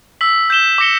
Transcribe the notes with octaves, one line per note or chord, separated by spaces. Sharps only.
E6 B6 F#7
G6 B6 E7 G7
D6 A#6 C#7 G7